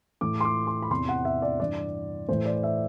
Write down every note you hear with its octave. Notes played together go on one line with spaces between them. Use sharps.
A2 E3 D6
C6
D6
C6
B5
E2 C3 E3 C6
F#5
E5
D5
G2 E3 D5
A2 E3 C5
D5
E5